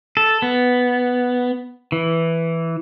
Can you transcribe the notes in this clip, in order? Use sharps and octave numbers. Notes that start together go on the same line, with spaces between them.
A4
B3
E3